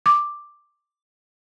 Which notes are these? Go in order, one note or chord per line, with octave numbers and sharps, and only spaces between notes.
D6